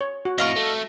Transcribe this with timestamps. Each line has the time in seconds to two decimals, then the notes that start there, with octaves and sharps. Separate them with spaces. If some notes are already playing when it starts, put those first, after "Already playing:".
0.01 C#5
0.25 F#4
0.38 F2 A2 D#5 F5 C#6
0.56 A3